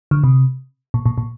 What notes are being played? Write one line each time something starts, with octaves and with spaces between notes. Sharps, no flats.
D3
C3
A#2
A#2
A#2